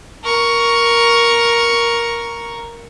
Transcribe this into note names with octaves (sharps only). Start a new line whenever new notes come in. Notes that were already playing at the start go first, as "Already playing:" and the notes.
A#4 C#6